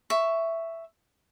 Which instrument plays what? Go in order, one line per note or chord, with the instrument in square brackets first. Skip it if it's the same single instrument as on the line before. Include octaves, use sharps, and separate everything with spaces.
[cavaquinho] E5 C#6